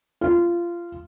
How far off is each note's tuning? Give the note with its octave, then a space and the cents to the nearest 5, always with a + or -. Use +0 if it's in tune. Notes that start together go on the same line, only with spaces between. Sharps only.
F4 -20